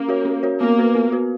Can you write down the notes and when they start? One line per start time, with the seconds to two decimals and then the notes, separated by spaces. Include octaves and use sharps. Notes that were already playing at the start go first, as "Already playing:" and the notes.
Already playing: A#3 C#4
0.08 F#4 A#4 C#5
0.25 C#4
0.43 F#4 A#4 C#5
0.60 A#3 B3
0.78 F#4 B4
0.95 B3
1.12 F#4 B4